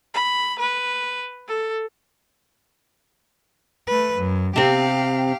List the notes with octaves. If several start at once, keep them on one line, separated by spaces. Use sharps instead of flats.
B5
B4
A4
A3 B4
F#2
C3 C4 G4 F5